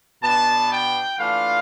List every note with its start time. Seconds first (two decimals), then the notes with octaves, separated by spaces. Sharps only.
0.22 B2 B3 D4 A5
0.71 G5
1.18 E3 A3 D4 F4 F5